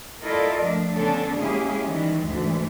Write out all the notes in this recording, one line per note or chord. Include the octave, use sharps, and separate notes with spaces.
E4 F4 A4 A#4 D5 D#5
F3 A3 D4
D3 B3 C#4 D4 A4
G#3 A#3 C#4 E4 G4 G#4
D#3 E3 G3
D2 G#2 E3